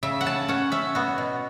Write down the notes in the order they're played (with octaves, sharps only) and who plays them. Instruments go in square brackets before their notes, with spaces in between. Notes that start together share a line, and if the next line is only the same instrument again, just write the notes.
[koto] C#3 E5
F#5
C#3 A5
C#4 F#5
C#4 E5
B3 F#4
B2